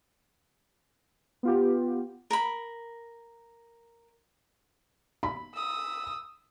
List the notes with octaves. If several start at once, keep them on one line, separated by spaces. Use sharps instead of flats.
B3 F4 G4
A#4 B5
B5
D#6 E6